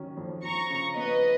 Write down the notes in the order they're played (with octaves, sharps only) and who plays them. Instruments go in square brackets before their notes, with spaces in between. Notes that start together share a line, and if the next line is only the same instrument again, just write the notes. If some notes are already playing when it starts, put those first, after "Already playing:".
Already playing: [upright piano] D#3 F#3 C#4
F2
[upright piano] F3 [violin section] A#5 C#6
[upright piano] C#3
[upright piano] B3 [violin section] B4 D#5